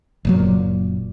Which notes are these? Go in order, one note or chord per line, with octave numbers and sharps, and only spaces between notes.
F#1 A#2 F#3